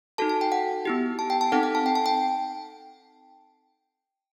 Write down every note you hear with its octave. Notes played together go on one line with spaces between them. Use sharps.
D#4 F#4 A4 A5
A5
G5
F#5
B3 E4 G4
A5
G5
A5
C4 D#4 A4 F#5
F#5
A5
G5
A5
G5